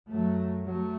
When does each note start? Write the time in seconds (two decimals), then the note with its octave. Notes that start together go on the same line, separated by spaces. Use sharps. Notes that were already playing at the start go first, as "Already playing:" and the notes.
0.10 F#2 F#3 A3
0.66 F#3 A3